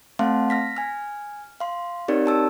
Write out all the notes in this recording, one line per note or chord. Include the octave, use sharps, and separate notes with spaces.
A3 C4 F5 F#5 A5 C6
F6 A#6 B6
G#5 F6
F5 C6
C4 D#4 G4 A#4 C#5 D5
G4 A5 E6